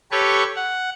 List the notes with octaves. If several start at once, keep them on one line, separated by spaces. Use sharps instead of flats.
G4 A4 B4 C#5 C#6
F#5